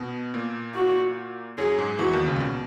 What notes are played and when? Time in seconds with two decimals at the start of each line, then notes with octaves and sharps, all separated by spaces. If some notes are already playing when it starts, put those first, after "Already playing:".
Already playing: B2 B3
0.34 A#2 A#3
0.75 F#4
1.58 F#2 F#3 G#4
1.78 G#2 G#3
1.99 E2 E3 F#4
2.13 D#2 D#3
2.26 C#2 C#3
2.36 A#2
2.40 B2